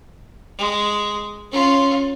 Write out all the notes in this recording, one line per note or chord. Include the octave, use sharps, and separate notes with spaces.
G#3
C#4 F4